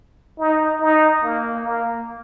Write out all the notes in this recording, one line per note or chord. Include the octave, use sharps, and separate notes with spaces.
D#4
D#4
A#3
A#3